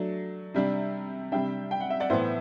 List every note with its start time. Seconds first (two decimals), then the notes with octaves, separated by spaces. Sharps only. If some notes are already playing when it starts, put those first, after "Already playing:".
Already playing: F#3 A3 D4
0.54 C3 G3 D4
1.32 C3 G3 D4 E5 G5
1.71 G5
1.80 F#5
1.90 E5
2.00 D5 F#5
2.10 A2 E3 B3 C5 E5